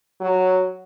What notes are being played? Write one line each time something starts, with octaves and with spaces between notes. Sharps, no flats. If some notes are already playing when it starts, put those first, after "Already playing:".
F#3